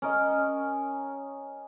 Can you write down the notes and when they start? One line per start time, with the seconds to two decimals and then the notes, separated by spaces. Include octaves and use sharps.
0.02 C#4 A#4 D#5